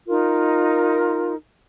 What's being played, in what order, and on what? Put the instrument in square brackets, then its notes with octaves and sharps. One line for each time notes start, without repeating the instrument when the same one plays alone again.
[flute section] D#4 F4 A#4